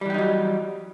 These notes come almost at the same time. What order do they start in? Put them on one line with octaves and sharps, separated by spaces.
G3 E3 G4 D#4 F#3